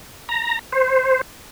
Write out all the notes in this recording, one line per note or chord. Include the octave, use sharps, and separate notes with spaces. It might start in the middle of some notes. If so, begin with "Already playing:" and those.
A#5
C5